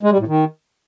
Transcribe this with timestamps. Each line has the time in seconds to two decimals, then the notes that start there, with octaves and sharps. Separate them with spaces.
0.03 G#3
0.11 G3
0.19 A2
0.27 D#3